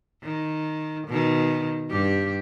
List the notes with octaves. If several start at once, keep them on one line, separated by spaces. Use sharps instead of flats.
D#3
B2 D#3
G2 G4